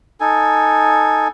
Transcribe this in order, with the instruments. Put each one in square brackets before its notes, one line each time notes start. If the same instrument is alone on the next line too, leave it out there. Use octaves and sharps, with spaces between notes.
[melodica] D#4 A4 G#5